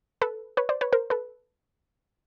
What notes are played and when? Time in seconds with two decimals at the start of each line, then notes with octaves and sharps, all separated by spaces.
0.22 A4 B4
0.57 B4 C#5
0.69 C5 D5
0.81 B4 C#5
0.93 A#4 C5
1.10 A4 B4